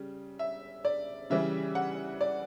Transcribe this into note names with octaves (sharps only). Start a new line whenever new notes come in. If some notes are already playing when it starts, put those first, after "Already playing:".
Already playing: C#3 G3
E5
D5
C#3 E3 G3 E5
F#5
D5